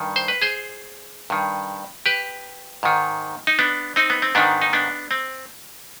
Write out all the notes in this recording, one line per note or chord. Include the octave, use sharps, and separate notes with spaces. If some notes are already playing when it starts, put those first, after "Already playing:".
Already playing: G2 D#3
C5
B4
G#4 C5
G2 D#3
G4 B4
G#2 D#3
D#4
B3 D4
C4 D#4
B3
C4
G#2 D#3 B3 D4
D#4
B3 D4
C4